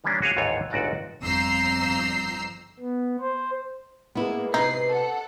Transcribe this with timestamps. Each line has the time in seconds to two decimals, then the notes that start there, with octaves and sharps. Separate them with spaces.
0.04 D#3 E3 G3 A#3 C#4 D4
0.22 F#4 G#4 C#5 F5 G5
0.37 A1 D#2 G#2 E3 F4 C#5
0.70 G1 C#2 G#2 F#4 D5 F#5
1.21 G1 F2 A#5 E6 G6 C7
2.79 B3
3.21 C5
4.15 G#3 A#3 B3 E4
4.54 C3 D#4 B4 C7
4.88 A4 F#5